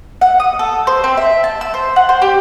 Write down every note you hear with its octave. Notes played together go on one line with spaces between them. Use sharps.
F#5
D#6
A4
C5
C4
E5
A5
E6
C5
F#5
C5
G4